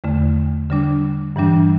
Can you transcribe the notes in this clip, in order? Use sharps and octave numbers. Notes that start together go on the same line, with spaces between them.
E2 D3 A3
D3 G3 D4
G2 E3 G3 D4